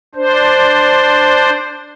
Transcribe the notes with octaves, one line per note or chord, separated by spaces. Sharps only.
D4 C5